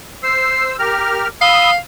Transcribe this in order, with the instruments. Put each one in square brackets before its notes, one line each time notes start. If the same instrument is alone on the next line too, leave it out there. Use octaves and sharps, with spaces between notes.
[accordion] C5 E6 [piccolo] C7
[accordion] G4 A#4 F6 [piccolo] A#6
[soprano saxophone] F5 [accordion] B5 D#6 E6 [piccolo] G7